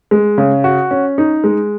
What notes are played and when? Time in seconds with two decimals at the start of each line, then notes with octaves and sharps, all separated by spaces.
0.11 G#3
0.38 C#3
0.64 F#4
0.91 C#4
1.18 D#4
1.44 G#3